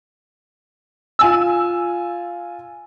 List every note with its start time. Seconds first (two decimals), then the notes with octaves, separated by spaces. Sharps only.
1.19 F4 G#5 E6